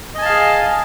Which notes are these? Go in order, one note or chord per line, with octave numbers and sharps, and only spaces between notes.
G#4 D#5 F5 G#5 A5